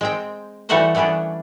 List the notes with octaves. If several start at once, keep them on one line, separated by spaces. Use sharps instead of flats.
G#3 C4 G5
E3 G3 A3 F#4 A4 C5
E3 G3 B3 C#4 D4